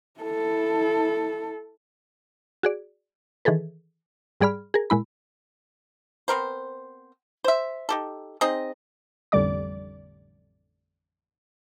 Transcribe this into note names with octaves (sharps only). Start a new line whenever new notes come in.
E4 A4
F#4 G#4 D5
D#3 E3 G#4 A4 B4
G#2 G3 G#4 D5 B5 F6
G#4 A#4
A#2 G#3 E4 B5
B3 C4 A#4 C5
C5 E5
D#4 G4 A4
C4 D#4 G#4 D#5
A1 F2 D3 G3 D5 D6